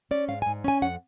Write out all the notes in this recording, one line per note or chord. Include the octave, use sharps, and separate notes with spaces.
C#4 D5
G#2 F5
G#5
G#2
C#4 G#5
F2 F#5